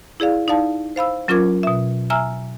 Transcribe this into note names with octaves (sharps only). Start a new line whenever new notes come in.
E4 G#4 D5 F5
D#4 D5 F5 A5
C5 F5 B5 E6
F#3 C#4 F4 A#4 D6 G#6
B2 E5
E5 G#5 A#5 E6 F6